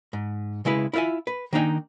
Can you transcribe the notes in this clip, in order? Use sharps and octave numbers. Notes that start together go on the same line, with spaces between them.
G#2
C#3 G#3 E4 B4
E4 F4 B4 E5 G#5
B4
D#3 A#3 D4 D#4 G5 G#5